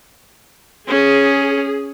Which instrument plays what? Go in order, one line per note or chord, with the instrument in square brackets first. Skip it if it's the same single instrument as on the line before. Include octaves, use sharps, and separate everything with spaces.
[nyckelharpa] C#4 [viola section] G#4